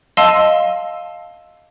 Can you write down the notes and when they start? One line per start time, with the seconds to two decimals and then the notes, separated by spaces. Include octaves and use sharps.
0.17 D#5 F5 A5 C6 E6 D#7